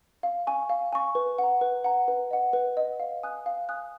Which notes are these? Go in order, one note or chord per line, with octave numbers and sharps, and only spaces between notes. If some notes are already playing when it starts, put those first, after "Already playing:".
F5
G#5 C#6
F5
G#5 C#6
B4
F#5 A#5
B4
F#5 A#5
B4
D#5 F#5
B4
D#5 F#5
F5
G#5 D#6 F#6
F5
G#5 D#6 F#6